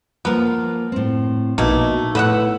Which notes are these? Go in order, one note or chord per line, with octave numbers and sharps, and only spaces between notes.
F3 A#3 B3 A#4
A2 C4
A#1 B2 A3 A#3 D#4
A2 B3 B4 D#5 F#5 E6